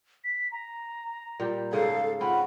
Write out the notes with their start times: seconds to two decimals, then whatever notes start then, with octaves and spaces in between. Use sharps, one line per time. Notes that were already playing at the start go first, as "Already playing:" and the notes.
0.24 B6
0.52 A#5
1.40 A#2 G3 G4
1.73 G#2 C#3 G#4 A4 F5
2.21 C4 C#4 F4 F#5 B5